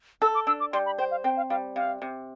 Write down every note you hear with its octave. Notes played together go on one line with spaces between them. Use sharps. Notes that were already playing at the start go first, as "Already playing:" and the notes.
A4 E6
D6
D4 E6
D6
G3 C6
B5
C5 G5
F5
C4 G5
F5
G3 F5
C3 F5
C3